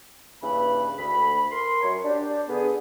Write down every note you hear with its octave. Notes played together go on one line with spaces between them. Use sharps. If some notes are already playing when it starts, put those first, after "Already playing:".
G2 C#3 E3 A#3 B4 B5
D2 B5
A#4 C6
F#2 C#5
D4 G4
D3 B3 G#4